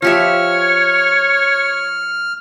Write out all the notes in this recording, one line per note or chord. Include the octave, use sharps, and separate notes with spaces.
F3 G4 C#5 E5 F6